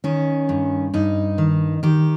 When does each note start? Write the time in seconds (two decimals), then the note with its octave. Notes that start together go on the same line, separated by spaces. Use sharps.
0.04 D#3 C#4
0.49 G2
0.94 G2 D#4
1.38 D#3
1.83 D#3 G4